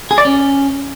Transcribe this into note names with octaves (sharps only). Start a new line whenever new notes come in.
G#4
D5
C#4